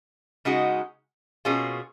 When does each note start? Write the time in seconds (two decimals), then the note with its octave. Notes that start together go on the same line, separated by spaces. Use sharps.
0.45 C#3 G#3 D#4 F#4
1.45 B2 A#3 C#4 F4 G#4